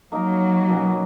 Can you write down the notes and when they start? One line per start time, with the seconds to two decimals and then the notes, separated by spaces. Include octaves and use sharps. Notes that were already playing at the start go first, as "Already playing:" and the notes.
0.12 F#3 A#3 D#4 A#4
0.69 B2 A#3 C#4 F#4